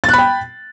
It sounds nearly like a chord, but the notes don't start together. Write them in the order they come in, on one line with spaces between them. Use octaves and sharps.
A6 F#6 B5 G5